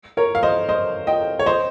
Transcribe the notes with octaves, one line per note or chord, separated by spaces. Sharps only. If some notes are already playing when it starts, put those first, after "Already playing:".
A#4 C#5
F5
C5 D#5
C5 D#5
D#5 G5
C#5
C5 D#5